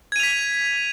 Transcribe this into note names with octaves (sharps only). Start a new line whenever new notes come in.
G#6 B6 D#7 F7